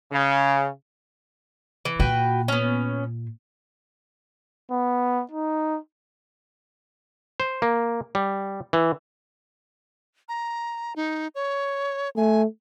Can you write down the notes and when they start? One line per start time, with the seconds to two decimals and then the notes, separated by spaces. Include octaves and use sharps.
0.11 C#3
1.85 E3
2.00 A#2 F#4 B4 G5
2.48 B3 C#4
4.71 B3
5.32 D#4
7.40 C5
7.62 A#3
8.15 G3
8.73 E3
10.29 A#5
10.96 D#4
11.35 C#5
12.17 A3 G#5